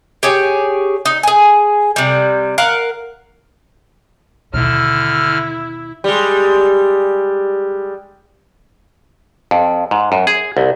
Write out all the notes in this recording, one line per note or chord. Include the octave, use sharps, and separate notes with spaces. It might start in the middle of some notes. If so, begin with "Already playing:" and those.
G4 G#4 C#5
D#4
G#4 G#5
C3 G3
A#4 F5 F#5
D#2 B2 D3 E4 F6
G3 G#3
F2
G#2
F#2
G#4
C2